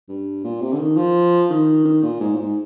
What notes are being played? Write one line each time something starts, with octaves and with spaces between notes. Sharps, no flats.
G2
A#2
C3
D3
D#3
F3
D#3
D#3
A#2
G#2
A#2
G#2